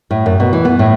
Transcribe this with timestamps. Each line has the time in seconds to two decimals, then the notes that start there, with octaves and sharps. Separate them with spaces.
0.11 A2
0.26 F#2
0.40 B2
0.53 E3
0.65 B3
0.79 A2